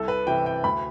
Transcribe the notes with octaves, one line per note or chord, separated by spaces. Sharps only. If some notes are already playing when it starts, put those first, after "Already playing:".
Already playing: C2 A4
B4
C3 E3 G5
G5
D2 B5